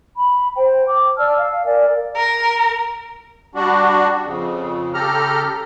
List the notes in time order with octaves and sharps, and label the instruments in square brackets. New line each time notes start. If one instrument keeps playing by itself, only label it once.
[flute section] B5
C5 G5
D6
D5 A5 E6 F6
F5
A#4 D5 G#5
[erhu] A#4
[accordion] G3 D4 F#4
F2 C#3
C#3 G4 A4 A#5 F6